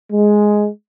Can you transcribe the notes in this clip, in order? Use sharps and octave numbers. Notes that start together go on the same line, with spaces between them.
G#3